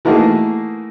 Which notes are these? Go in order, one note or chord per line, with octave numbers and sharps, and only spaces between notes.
E3 A3 A#3 D#4 F#4 G#4